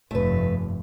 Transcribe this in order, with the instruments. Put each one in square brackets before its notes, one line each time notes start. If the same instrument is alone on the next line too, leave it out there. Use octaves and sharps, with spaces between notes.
[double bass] F1 G2 [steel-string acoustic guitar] A3 B4